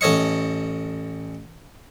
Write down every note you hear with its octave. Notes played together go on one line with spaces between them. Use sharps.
A1 A4 C#5 D#5 C#6